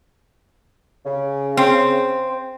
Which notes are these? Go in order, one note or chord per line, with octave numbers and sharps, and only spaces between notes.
C#3
C4